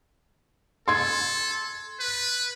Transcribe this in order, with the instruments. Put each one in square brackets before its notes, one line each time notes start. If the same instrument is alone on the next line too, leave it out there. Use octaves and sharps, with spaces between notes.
[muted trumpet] A4 [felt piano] C6 G#6
[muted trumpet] B4